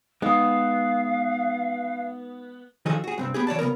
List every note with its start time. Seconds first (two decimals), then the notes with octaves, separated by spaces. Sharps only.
0.22 G#3 B3 D#4 F5 D#6
2.86 D#3 F3 F#4 G#4 A4 D#5
3.04 F#4 G#4
3.18 G2 C3 C4
3.34 B3 G4 G#4
3.47 E3 C#5 D5 A5
3.59 C#3 E3 B3 A#4